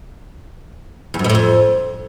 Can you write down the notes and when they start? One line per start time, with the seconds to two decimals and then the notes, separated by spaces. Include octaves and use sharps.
1.14 E2
1.19 F#2
1.24 B2
1.30 A2
1.35 F2